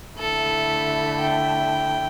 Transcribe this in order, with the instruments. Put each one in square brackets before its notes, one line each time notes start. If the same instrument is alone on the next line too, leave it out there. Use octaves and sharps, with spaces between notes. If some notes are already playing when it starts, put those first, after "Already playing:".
[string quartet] D3 A3 E4 [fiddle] A4
[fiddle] G5